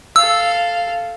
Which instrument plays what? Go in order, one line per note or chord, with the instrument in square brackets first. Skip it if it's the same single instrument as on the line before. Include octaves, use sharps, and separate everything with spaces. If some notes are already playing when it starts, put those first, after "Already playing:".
[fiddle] A4 F5 [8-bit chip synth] E6